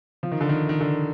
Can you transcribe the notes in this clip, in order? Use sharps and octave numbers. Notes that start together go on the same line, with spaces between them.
F3
D#3
D3
D#3
D#3
D3